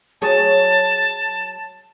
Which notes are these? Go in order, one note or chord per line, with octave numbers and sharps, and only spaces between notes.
F#3 G#4 C#5 A5